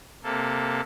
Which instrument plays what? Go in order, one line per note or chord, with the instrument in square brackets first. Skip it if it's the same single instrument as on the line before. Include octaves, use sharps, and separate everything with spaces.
[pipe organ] C3 A#3 A4